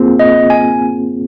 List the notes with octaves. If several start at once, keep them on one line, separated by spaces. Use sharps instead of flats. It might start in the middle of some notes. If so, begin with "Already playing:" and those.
Already playing: A#3 C4 F4 G#4
D#5
G#5